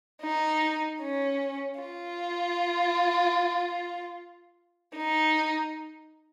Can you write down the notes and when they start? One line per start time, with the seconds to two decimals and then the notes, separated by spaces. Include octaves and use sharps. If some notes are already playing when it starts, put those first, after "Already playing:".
0.22 D#4
1.02 C#4
1.80 F4
4.97 D#4